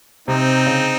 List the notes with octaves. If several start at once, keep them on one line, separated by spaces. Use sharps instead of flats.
C3 C4 D#4
C#3